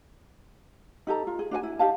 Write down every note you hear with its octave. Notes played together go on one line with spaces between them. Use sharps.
D#4 G4 A4 A#5
F4
G#4
D4 F#4 C5 G#5
E4
D#4 G4 F5 A5